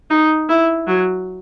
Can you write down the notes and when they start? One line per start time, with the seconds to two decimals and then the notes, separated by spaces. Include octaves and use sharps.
0.10 D#4
0.49 E4
0.87 F#3